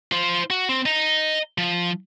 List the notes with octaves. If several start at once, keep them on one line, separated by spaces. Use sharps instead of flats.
F4 C5
F#4
C4
D#5 A#5
F3